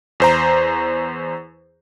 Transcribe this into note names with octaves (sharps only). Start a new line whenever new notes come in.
E2 C5 A#5